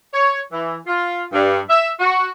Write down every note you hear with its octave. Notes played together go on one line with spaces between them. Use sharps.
C#5
E3
F4
G2
E5
F#4